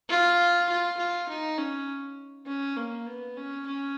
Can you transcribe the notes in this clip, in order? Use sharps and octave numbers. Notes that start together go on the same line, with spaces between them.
F4
F4
F4
D#4
C#4
C#4
A#3
B3
C#4
C#4